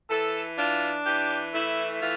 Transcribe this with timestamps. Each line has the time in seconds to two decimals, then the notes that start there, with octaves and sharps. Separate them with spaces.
0.10 E3 A4
0.57 D4 F4
1.05 E3 G4
1.53 A3 E4
2.00 E3 F4